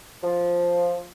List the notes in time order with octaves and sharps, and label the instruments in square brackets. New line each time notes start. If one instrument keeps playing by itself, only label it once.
[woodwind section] F3